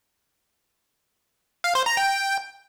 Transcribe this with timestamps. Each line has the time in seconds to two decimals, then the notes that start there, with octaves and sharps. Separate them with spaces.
1.64 F5
1.75 C5
1.86 A#5
1.97 G5